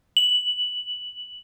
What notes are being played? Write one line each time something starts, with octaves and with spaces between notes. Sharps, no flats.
F#7